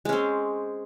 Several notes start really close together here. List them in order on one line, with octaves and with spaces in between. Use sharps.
G#3 C#4 C4